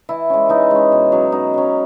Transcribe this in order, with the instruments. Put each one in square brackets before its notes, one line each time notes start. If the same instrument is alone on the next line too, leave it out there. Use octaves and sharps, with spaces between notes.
[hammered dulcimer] E3 E4
G#3 C#4
E3 D#4
G#3 C#4
B2
F#3 C#4
B2 D#4
F#3 C#4